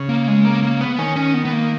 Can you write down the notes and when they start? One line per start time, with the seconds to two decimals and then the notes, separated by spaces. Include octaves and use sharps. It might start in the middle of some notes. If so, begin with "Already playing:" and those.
Already playing: C#3
0.09 A#3
0.28 G#3
0.45 A#3
0.63 A#3
0.81 B3
0.99 D#3 C#4
1.16 C#4
1.34 B3
1.45 B3
1.52 A#3